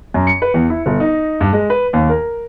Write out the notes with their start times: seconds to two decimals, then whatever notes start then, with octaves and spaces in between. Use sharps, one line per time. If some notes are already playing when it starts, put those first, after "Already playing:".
0.14 F#2
0.27 C#7
0.42 B4
0.54 E2
0.70 E4
0.86 G1
1.00 D#4
1.41 G2
1.53 G#3
1.70 B4
1.93 D#2
2.09 A#4